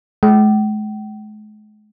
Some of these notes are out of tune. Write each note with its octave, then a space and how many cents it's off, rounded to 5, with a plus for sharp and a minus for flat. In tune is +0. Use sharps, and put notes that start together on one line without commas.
G#3 +40 G5 -40